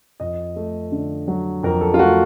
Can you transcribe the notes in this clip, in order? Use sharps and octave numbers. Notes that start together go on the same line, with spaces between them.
F2 D#5
A3
D3
F#3
F2 A#4
A4
F4
A3 F#4